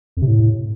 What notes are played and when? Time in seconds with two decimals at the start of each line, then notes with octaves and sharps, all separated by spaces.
0.17 F2
0.22 C3
0.27 A2